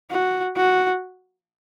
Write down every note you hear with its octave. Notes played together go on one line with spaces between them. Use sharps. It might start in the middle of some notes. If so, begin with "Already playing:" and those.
F#4
F#4